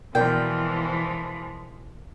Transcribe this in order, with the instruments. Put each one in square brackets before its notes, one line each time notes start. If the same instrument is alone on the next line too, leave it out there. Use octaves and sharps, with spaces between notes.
[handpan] B2 A#4 D5 [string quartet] E3 F3 G#3 [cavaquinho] G5